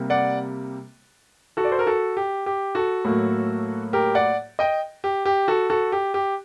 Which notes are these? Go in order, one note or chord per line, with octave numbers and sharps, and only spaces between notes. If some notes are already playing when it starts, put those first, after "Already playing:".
Already playing: C3 G3 A#3
D5 F#5
F#4 A4
D5
C5
A#4
F#4 A4
G4
G4
F#4 A4
A2 F#3 A#3
G4 A#4
D5 F#5
D#5 G5
G4
G4
F#4 A4
F#4 A4
G4
G4